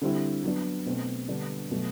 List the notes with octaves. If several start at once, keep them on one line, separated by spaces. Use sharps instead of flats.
D3 G3 C4 E4
F#3 B3 D4
B2 A3 C4
D3 G3 B3 D4
B2 F#3 A3